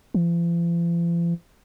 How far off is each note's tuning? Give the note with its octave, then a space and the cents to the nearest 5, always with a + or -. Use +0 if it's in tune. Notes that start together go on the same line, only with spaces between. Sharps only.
F3 -45